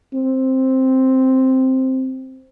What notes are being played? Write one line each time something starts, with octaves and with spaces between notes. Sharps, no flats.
C4